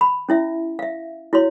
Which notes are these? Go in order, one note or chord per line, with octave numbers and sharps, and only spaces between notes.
B5
C#4 E4 E5
E5 F5
E4 F#4 C#5 C6